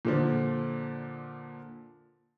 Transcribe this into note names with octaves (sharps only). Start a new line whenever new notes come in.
A#2 D3 F3